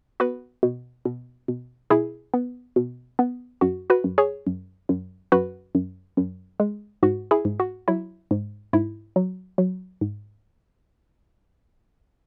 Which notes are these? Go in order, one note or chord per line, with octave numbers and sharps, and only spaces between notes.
B3 F#4 B4
B2
B2
B2
B2 E4 G#4
B3
B2
B3
F#2 F#4
F#4 B4
F#2
G#4 C#5
F#2
F#2
F#2 F#4 B4
F#2
F#2
G#3
G#2 F#4
E4 G#4
G#2
F#4
F#3 E4
G#2
G#2 E4
F#3
F#3
G#2